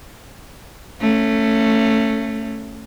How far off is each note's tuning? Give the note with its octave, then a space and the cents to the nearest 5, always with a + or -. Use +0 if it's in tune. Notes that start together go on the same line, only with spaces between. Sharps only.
A3 +15 C#4 -5